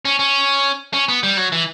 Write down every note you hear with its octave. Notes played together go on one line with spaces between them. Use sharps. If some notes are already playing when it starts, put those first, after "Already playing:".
C#4
C#4
C#4
B3
G3
F#3
E3